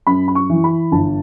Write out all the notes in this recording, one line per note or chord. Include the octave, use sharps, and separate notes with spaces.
F#2 B5
B5
C#6
E3
B5
G1 A5